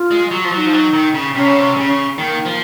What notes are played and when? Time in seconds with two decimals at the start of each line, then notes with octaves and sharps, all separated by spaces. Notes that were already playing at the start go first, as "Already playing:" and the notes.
Already playing: F4
0.11 G#3
0.31 F#3
0.44 F3
0.52 F#3 F4
0.57 D#4
0.66 F3
0.73 F#3
0.93 D#3
1.14 C#3
1.35 C3 C#4
1.46 C#3
1.59 C3
1.76 C#3
2.18 D#3 A#3
2.45 F3